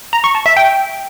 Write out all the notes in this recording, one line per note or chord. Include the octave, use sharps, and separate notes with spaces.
A#5
C#6
A5
E5
G5